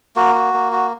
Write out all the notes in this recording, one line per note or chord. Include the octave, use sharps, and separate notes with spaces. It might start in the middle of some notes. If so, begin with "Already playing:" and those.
A#3 F#4
F#4
A#3
F#4